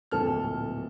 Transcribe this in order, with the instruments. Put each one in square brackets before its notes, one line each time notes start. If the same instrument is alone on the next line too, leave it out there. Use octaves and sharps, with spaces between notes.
[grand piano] D1 A#1 A4 F6